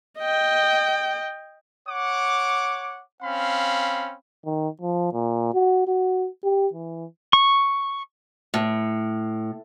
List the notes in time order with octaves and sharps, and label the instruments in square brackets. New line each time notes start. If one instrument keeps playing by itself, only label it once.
[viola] D#5 G5
[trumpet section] C#5 F#5 D6
C4 C#4 F5 B5
[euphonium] D#3
F3
A#2
F#4
F#4
G4
E3
[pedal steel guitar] C#6
[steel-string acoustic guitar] A2